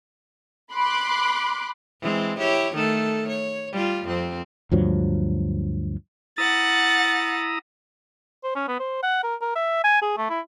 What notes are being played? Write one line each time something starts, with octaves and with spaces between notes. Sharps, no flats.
B5 C6 D6 F#6
E3 G#3 C4
E4 G4 C#5
D#3 A3 A4
C#5
G3 F4
F2 C4
D2 G2 F3 F#3
E4 F#5 A#5 D#6 A6
C5
C#4
B3
C5
F#5
A#4
A#4
E5
G#5
G#4
A3
E4